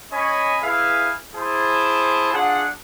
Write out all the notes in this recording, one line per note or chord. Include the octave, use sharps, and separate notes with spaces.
C#4 C#5 D#5 G#5 B5
E4 G#4 B4 E5 F5
E4 G#4 C5 A5
D4 F4 G#4 F#5